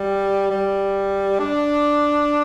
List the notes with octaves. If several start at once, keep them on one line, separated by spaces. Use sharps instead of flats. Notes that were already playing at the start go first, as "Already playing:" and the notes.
Already playing: G3
G3
D4